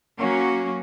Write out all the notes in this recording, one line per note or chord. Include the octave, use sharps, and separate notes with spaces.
F#3 A#3 C#4 F#4